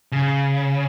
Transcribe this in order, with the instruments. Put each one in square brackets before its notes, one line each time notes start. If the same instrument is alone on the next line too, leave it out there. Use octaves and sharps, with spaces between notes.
[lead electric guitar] C#3